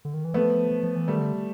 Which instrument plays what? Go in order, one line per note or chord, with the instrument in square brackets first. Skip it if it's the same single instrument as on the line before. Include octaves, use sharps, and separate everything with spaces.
[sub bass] D3
D#3
E3
[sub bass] F3 [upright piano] A3 B3
[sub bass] F3
F3
E3
[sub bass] D#3 [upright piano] G3 A3
[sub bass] D3